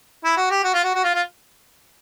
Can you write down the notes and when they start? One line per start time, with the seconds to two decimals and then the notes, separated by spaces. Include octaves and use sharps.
0.24 E4
0.37 F#4
0.51 G4
0.64 F#4
0.74 F4
0.84 F#4
0.95 F#4
1.04 F4
1.14 F4